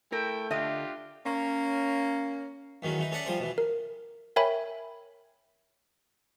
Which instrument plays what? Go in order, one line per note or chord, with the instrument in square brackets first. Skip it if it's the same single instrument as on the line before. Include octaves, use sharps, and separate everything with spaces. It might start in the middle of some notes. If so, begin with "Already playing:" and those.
[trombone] A3 [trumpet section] E4 G5 [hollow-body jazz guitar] A#4
[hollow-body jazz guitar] D3 D#5 [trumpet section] D4 F4 G4 [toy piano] E5
[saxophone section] A#3 C#4
[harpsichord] E2 D#3 F#3 C#4
E3 D#4
C#4 G#4 A4 D5 E5 F#5
F3 G3 G#4 C5
B2 E3
[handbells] A#4
A#4 C#5 E5 G5 G#5 B5